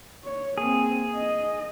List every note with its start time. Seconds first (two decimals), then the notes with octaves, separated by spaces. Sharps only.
0.24 C#5
0.58 A#3 C4 G#4
1.16 D#5